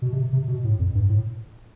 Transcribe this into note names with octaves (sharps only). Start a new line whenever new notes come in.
B2
C3
C3
B2
A2
F2
G2
A2